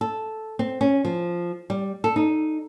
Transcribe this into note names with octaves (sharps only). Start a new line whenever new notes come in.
A4
C4
C#4
F3
G3
A4
D#4